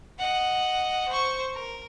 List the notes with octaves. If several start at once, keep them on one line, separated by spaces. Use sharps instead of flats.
D#5 F#5
C5 C#6
A#4